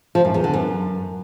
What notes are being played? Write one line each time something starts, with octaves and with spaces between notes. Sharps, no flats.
F3
F#2
E2
D3
F#2